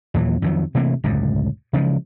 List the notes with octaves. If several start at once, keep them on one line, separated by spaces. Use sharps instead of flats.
D#2 A#2 E3 F#3
F2 D#3 F#3
C3 E3 A3 A#3
D1 C#2 F#2
C#3 E3 F3 G#3